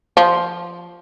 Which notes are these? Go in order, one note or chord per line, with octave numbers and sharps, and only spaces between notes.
F3